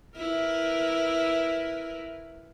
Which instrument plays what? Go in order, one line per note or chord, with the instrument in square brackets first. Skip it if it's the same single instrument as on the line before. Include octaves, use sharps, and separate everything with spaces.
[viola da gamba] E4 A#4 B4